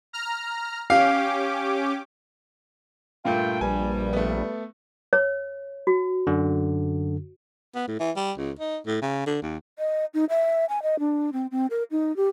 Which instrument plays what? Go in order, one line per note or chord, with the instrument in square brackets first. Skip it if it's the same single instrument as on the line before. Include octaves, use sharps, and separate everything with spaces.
[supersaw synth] A#5 F6
[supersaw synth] C#4 G4 D6 [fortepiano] F5
[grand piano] G2 A#2 A3 [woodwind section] F4 G5
[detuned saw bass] A#1 [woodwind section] G2 G3 [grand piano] G#5
[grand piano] A3 B3
[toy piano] C#5
F#4
[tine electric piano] F#2 D3
[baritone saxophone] B3
A2
E3
G3
C#2
D#4
A2
C#3
D3
D#2
[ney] D#5
D#4
E5
G#5
D#5
D4
C4
C4
A#4
D#4
G4